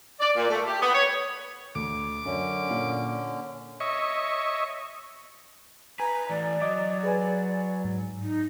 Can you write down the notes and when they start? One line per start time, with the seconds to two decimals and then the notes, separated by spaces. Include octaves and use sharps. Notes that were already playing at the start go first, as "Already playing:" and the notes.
0.20 D5
0.36 A#2
0.50 A3
0.67 G4
0.82 B3
0.95 C#5
1.75 D2 D6
2.25 F#2 D3 C#4
2.69 A#2 A#3 F5
3.80 C#5 D#5 E5 C#6
6.00 B4 G#5 A#5
6.30 E3 A3 D5
6.61 F#3 D#5 D6
7.03 G#4 B4 G#5
7.85 G#2
8.22 D#4